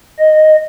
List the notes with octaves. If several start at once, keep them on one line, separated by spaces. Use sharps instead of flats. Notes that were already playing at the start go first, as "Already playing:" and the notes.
D#5